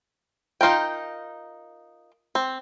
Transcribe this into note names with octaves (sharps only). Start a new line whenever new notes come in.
D#4 F4 A#4 G5
C4